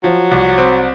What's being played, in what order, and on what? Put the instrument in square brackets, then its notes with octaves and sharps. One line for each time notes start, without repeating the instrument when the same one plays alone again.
[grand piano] F3 [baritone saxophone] F#3
[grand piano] C2
C4